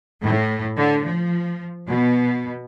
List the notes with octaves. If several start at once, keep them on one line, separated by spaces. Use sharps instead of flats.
A2
D3
F3
B2